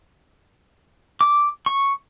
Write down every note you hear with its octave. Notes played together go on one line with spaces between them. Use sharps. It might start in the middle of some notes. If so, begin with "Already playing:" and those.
D6
C#6